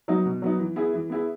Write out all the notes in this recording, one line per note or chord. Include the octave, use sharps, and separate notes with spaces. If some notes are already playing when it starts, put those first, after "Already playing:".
F#3 B3 D#4
B2
F#3 B3 D#4
E3
B3 E4 G#4
E3
B3 E4 G#4